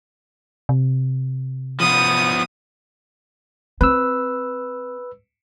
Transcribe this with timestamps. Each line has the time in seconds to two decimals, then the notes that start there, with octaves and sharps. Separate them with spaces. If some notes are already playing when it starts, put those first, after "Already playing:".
0.69 C3
1.80 F3 B3 D#6
3.81 C4 B4 E6